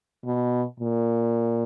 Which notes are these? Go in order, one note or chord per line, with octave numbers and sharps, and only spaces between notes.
B2
A#2